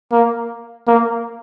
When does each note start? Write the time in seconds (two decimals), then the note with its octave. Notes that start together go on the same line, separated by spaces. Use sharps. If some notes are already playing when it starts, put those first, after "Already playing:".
0.12 A#3
0.87 A#3